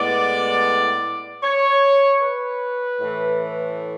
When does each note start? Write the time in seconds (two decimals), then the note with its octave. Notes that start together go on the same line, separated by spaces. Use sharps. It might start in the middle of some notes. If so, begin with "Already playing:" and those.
Already playing: A2 G#3 B3 D5
1.43 C#5
2.21 B4
3.00 A2 E3 A3